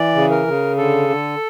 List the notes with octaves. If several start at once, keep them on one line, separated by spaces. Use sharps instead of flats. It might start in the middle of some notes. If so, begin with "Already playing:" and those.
Already playing: E3 D5
C#3
A#4
C#3
D3 A4
D3